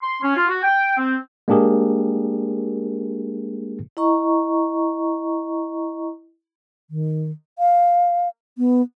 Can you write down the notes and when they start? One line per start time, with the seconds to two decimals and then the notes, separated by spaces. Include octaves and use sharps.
0.02 C6
0.22 C#4
0.36 F4
0.48 F#4
0.63 G5
0.97 C4
1.48 G#3 A#3 D4 G4 G#4 A#4
3.97 E4 D#5 A#5 C#6
6.88 D#3
7.59 F5
8.58 B3